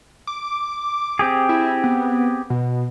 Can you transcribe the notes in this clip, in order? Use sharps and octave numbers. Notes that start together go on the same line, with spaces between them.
D6
C4 G4 G#4
E4
B3
B2